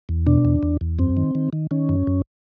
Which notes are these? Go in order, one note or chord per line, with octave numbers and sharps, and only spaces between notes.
E2
B2 D4
E2
E2
E2
F#2 C4
D#3
D#3
D#3
D#3 C#4
F#2
F#2